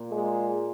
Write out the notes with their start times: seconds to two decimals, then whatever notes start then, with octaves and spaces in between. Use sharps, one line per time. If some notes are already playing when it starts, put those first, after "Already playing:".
Already playing: A#2
0.12 G#3